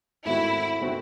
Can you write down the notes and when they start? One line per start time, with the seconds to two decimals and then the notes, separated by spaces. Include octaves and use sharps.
0.25 G#2 D#3 A3 C4 E4 F#4
0.80 D#3 A3 C4 F#4